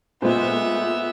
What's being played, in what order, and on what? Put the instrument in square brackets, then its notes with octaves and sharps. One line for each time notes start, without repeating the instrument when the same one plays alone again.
[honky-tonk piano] A#2 A3 F4 [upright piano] G#3 C5 [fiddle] B3 E5